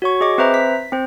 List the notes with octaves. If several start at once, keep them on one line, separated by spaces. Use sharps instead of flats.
F#4 C#5 C#6
G#4 D#5 D6
C4 B4 C5 E5 A#5
B6
C4 C5